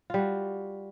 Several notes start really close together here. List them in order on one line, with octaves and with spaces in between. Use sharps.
F4 G3 F#4